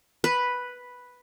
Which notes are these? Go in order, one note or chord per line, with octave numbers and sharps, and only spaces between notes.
B4